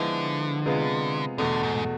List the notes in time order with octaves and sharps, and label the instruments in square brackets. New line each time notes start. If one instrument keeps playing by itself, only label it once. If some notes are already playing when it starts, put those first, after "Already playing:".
Already playing: [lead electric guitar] D3 [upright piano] F3 G#3 B3 E4
[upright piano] C3 G#3 B3 F4 G#4
[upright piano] E2 B2 A3 [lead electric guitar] D3
[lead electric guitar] G#2